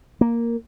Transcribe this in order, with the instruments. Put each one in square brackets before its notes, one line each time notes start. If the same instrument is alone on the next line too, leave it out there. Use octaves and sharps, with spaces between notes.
[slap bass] A#3